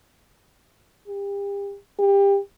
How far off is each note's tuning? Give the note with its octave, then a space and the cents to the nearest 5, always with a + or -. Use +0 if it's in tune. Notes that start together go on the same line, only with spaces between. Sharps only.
G4 +35
G4 +25